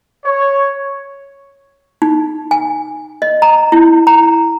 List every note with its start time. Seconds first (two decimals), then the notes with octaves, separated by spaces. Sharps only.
0.25 C#5
2.02 D#4
2.51 G#5
3.22 D#5
3.42 A#5
3.72 E4
4.07 A#5